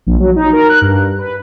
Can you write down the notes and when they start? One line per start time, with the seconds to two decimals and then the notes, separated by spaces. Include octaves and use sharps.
0.06 A#1
0.20 F#3
0.36 D#4
0.53 A#4
0.69 F#6
0.82 G2
1.19 B4